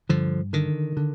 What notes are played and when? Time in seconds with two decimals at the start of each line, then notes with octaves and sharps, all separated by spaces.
0.09 G2 D3 F3
0.53 D3 D#3
0.97 D3